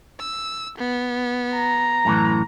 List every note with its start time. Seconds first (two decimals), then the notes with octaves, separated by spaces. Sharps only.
0.19 E6
0.78 B3
1.56 A#5
2.05 F#2 A2 E3